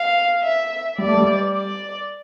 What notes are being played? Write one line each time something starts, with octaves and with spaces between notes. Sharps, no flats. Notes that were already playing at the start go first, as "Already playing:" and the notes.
Already playing: F5
E5
G3 D5
A3
G3
D5